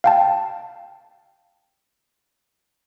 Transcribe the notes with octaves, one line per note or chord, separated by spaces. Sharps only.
F5 G5 A5